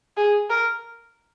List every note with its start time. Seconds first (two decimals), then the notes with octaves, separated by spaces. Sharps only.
0.17 G#4
0.50 A#4